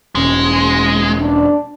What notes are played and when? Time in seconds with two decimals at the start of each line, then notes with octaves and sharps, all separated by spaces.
0.15 E1 G#3 C#4
1.20 D4